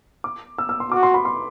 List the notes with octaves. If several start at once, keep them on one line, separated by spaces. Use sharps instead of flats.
D6
E6
E6
C6
F#4 D6
C6
B5
C6